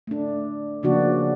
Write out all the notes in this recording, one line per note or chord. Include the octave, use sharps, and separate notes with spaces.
A3 D4
C#3 F3 A#3 D4 F#4 D5